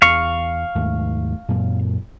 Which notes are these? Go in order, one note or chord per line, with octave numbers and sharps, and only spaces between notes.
E2 F5 C#6
D#2 G#2 A3
F#2 A#2